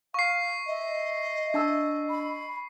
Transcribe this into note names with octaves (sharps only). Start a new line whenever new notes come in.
F5 C#6 C7
D#5 E5
D4 A5 E6
B5